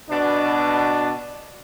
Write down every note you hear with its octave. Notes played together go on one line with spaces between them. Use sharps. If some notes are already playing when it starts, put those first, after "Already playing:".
B2 D4